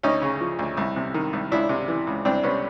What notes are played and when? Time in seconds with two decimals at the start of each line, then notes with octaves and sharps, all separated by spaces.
0.03 D2 C#4 D#4
0.22 C#3
0.40 F3
0.59 D2
0.77 C2
0.96 C3
1.14 D#3
1.33 C2
1.52 C#2 D4 E4
1.69 C3
1.88 E3
2.07 C#2
2.25 C2 C4 D4
2.43 C3 B3 C#4